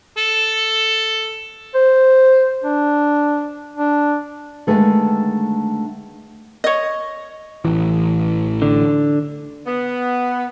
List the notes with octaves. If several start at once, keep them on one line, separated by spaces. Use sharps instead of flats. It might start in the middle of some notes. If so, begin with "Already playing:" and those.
A4
C5
D4
D4
D3 D#3 G#3 A3 B4
C#5 D#5
A1 E3
D3
B3